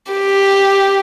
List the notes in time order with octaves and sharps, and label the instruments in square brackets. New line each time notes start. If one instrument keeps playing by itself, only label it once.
[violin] G4